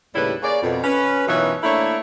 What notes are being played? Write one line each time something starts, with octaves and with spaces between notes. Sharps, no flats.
D#2 A2 C#3 G3 E4 B4
A#3 G#4 C#5 D5
F2 B2
C#4 B4
F#2 B2 E3 D#4 F4 C#5
A3 A#3 D4 E4 C#5